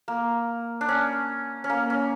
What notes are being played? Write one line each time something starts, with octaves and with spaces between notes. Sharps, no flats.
A#3
D4
C#4
C#4
A#3
C#4